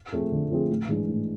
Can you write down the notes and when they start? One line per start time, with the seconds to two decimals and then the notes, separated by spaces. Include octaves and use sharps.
0.12 F3 A3 C4 G#4
0.32 D3
0.50 F3 A3 C4 G#4
0.70 A1
0.88 G#2 E3 G#3 D4
1.08 A1